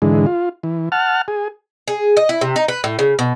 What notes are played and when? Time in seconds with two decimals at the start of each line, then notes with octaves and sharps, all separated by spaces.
0.02 G#2 D3 E3 G#3
0.26 F4
0.63 E3
0.92 F#5 A5 F6
1.28 G#4
1.88 G#4
2.17 D#5
2.29 E4
2.41 C3
2.56 D#4
2.68 B4
2.84 A2
2.99 C#3
3.19 B2